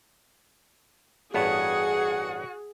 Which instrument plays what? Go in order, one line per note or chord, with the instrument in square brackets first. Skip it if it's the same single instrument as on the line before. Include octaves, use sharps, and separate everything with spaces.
[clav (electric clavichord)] A1 G2 B3 [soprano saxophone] F#4 [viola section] G#4 [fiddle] F#5